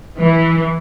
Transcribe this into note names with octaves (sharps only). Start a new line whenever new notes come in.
E3